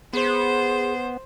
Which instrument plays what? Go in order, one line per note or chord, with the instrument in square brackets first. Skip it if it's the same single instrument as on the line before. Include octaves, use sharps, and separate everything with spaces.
[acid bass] B3 [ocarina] G#4 [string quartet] C5